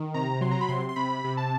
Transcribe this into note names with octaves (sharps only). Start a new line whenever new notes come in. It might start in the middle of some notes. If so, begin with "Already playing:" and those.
Already playing: D#3
C3 A#5
F#3 C6
A#5
B5
C3 C6
C6
C3 B5
C3
A5